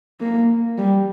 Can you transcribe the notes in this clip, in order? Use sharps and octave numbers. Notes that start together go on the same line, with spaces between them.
A#3
G3